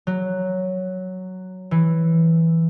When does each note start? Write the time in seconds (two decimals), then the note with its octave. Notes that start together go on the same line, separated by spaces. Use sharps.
0.07 F#3
1.71 E3